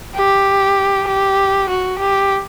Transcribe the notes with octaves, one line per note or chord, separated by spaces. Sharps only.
G4
G4
F#4
G4